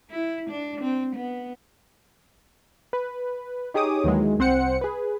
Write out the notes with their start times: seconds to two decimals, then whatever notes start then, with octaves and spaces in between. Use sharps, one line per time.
0.11 E4
0.50 D4
0.81 C4
1.15 B3
2.93 B4
3.74 D#4 G4 G#4 C#5 D6 D#6
4.04 D#2 D#3 E3 F#3 G#3
4.39 C2 C4 C5 F#5 C#7
4.81 G#4 B4